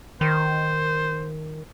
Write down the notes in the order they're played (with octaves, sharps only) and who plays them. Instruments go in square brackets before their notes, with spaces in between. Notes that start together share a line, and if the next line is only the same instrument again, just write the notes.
[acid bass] D#3 [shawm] C5